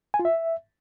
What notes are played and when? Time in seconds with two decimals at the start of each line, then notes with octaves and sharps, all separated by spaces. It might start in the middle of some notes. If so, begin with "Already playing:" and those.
0.14 G#5
0.19 F4
0.25 E5